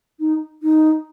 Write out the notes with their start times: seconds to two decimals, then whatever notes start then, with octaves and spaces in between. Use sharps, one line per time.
0.20 D#4
0.62 D#4